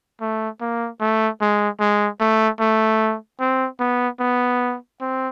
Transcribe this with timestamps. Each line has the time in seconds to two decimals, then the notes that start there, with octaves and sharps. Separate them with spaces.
0.21 A3
0.61 A#3
1.01 A3
1.41 G#3
1.80 G#3
2.21 A3
2.60 A3
3.40 C4
3.80 B3
4.20 B3
5.01 C4